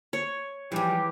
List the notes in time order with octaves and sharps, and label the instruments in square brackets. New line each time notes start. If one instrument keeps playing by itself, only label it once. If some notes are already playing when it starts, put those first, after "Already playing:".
[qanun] C#5
[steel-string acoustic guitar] E2 E3 [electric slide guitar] F3 G3 [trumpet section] G4